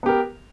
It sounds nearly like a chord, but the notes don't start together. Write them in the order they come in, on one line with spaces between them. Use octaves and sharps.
B3 G4 A#4